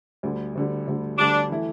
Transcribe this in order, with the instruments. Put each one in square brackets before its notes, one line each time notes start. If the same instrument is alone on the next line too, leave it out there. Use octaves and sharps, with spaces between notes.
[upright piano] D2 D3 G3
D2 D3 G3
D2 D3 G3
[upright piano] D2 D3 G3 [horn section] D4
[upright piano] E3 A3 E4